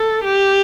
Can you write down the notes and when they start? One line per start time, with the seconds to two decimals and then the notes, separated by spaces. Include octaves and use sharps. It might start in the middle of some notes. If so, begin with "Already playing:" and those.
Already playing: A4
0.25 G4